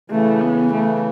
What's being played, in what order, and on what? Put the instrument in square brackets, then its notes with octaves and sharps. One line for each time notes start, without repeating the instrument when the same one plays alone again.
[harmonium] C#3 E3 [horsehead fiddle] A3
[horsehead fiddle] B3
A3